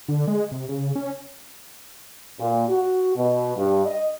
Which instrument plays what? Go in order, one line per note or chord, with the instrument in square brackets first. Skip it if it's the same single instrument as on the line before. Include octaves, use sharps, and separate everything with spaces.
[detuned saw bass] D3
G#3
C3
C#3
C#4
[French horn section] A#2
F#4
B2
G2
D#5